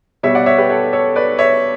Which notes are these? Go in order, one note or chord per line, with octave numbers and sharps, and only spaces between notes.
B2 G3 C#5 E5
D5 F#5
C#5 E5
G4 B4
A4 C#5
A4 C#5
B4 D5
C#5 E5